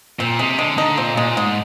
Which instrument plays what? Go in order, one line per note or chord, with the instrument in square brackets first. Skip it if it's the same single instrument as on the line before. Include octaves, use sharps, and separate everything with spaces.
[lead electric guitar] A#2 [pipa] C4
[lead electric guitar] C3 [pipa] G#3
[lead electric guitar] D3 [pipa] G#3
[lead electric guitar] D3 [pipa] D#4
[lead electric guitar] A#2 [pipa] C4
[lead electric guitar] A#2 [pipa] G#3
[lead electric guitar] G#2 [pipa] G#3